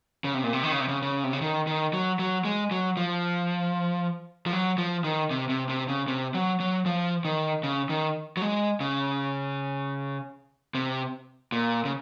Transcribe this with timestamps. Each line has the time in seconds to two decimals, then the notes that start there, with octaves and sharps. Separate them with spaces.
0.24 C#3
0.34 C3
0.44 A#2
0.53 C3
0.63 D#3
0.72 C#3
0.80 C3
0.88 C#3
1.02 C#3
1.24 C3
1.33 C#3
1.41 D#3
1.67 D#3
1.93 F#3
2.19 F#3
2.45 G#3
2.71 F#3
2.97 F3
4.46 F3
4.53 F#3
4.78 F3
5.04 D#3
5.30 C3
5.49 C3
5.69 C3
5.88 C#3
6.08 C3
6.34 F#3
6.60 F#3
6.86 F3
7.25 D#3
7.63 C#3
7.89 D#3
8.37 F#3
8.42 G#3
8.80 C#3
10.75 C3
11.52 A#2
11.85 C#3